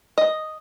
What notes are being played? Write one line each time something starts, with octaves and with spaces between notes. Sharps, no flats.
D#5